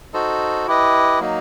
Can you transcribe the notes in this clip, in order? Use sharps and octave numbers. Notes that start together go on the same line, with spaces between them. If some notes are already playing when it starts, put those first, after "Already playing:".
D#4 F#4 A4 C5
E4 G4 B4 D#5
F#3 A#3 D#4